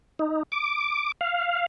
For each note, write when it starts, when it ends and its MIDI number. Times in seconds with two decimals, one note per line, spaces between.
0.19 0.43 63
0.52 1.12 86
1.21 1.66 77